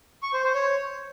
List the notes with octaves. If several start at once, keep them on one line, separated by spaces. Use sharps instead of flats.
C#6
C5
C5
C#5